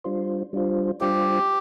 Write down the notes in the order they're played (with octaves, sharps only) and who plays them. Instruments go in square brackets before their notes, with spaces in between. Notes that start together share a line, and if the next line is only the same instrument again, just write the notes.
[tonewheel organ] G3 D4 F4 C5
G3 D4 F4 C5
[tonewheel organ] G3 D4 F4 C5 [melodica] G4